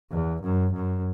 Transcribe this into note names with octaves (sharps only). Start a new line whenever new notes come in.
E2
F#2
F#2